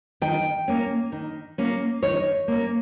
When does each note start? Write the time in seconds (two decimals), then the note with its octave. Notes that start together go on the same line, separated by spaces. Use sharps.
0.21 D#3 G5
0.68 A#3 C#4
1.12 D#3
1.58 A#3 C#4
2.03 D#3 C#5
2.48 A#3 C#4